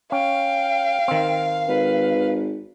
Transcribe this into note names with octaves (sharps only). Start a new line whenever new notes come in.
C#4 F5 G5
D#3 C4
G#1 B4